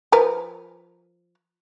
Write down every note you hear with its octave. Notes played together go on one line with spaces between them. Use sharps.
F3 A#4 B4